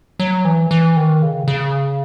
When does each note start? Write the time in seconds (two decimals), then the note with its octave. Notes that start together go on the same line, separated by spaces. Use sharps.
0.20 F#3
0.45 E3
0.71 E3
0.97 D#3
1.22 C#3
1.48 C#3